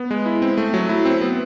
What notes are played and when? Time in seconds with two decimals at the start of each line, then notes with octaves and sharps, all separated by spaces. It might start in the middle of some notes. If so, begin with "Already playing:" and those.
Already playing: B3
0.11 G#3
0.26 E4
0.42 C4
0.57 A3
0.74 F#3
0.89 E4
1.05 C4
1.21 B3